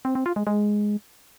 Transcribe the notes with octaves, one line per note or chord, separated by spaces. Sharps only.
C4
C4
F4
G#3
G#3